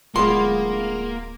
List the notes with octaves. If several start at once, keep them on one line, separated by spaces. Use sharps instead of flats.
D1 G#3 A#3 B3 F4 C6